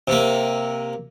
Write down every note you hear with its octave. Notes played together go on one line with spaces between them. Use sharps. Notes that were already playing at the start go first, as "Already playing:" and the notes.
C3 A#3